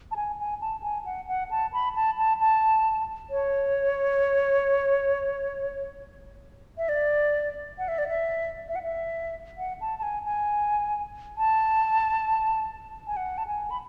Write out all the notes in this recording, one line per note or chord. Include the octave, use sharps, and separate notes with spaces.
A5
G#5
G#5
A5
G#5
F#5
F#5
A5
B5
A5
A5
A5
C#5
E5
D5
F#5
E5
D5
E5
E5
F#5
E5
F#5
A5
A5
G#5
G#5
A5
G#5
F#5
A5
G#5
B5